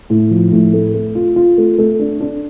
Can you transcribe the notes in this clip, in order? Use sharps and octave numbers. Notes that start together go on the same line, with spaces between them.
A2
F3
A2
A3
A3
F4
F4
A3
A3
D4
D4